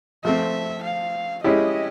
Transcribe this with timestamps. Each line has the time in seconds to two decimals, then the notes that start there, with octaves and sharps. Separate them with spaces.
0.24 F3 A3 C4 E5
0.84 F5
1.43 G#3 C#4 E4 G4 D#5